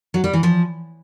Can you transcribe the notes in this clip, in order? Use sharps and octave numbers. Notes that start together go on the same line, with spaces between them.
F#3
G3
E3
F3